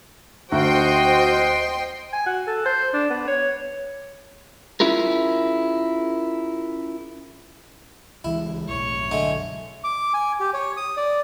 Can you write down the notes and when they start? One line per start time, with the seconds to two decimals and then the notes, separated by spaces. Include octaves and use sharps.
0.52 D2 F#4 C5 D#5 G5 C6
2.13 G#5
2.26 F#4
2.47 A4
2.66 C5
2.93 D4
3.10 B3
3.27 C#5
4.80 C#4 E4 F4 G#4 A#4
8.24 C#2 E3 G#3 E4
8.68 B1 F#2 A2 C#5
9.11 D3 G#3 A3
9.84 D6
10.14 G#5
10.40 G4
10.54 C#5
10.77 D#6
10.97 D5